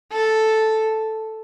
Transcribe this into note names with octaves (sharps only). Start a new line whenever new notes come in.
A4